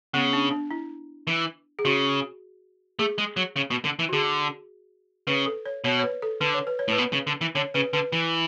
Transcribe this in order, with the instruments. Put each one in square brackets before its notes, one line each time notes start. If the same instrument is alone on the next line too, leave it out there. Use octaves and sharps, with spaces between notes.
[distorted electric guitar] C#3 [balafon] B3
[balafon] D4
D4
E4
[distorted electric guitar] E3
[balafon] G#4
[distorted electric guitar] C#3 [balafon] F#4
[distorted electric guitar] A3 [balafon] G#4
[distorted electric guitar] G#3
F#3
C#3
B2
D3
E3
[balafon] F#4
[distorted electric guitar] D3 [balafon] G#4
[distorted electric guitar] C#3 [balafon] B4
[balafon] A4
C#5
[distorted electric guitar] B2 [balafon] C#5
[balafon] C#5
B4
A4
[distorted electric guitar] D3 [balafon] B4
[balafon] C#5
B4
C#5
[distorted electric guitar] A2 [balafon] B4
[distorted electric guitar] B2
C#3
D3
E3
[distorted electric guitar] D3 [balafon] C#5
[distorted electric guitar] C#3 [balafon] B4
[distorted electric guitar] D3 [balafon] B4
[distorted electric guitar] E3